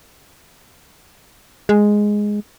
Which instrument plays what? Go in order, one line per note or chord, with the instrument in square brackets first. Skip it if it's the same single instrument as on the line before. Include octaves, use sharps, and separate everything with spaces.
[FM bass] G#3